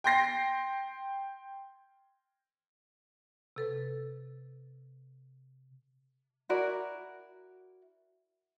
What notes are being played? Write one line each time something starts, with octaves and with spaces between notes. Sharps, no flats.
G5 C6 A#6 C7
C3 A4 B4
E4 F#4 A#4 D5